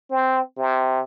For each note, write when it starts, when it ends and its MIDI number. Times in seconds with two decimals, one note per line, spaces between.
0.10 0.41 60
0.57 1.00 48